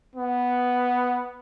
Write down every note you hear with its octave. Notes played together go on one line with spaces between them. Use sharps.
B3